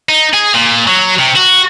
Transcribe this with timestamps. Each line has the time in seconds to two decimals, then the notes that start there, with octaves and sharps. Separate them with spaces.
0.09 D#4
0.33 G#4
0.54 A#2
0.87 F#3
1.19 C3
1.35 F#4